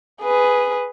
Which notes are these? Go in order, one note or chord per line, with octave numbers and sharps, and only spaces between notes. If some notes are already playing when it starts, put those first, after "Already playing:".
G#4 B4